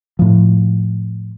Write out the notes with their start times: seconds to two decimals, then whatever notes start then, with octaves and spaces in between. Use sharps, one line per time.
0.19 A2 F3